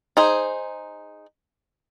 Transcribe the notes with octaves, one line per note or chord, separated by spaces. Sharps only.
D#4 G#4 C5